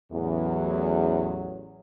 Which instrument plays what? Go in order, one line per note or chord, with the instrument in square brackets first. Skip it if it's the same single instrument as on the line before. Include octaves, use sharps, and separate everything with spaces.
[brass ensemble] A1 F#3 [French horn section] E2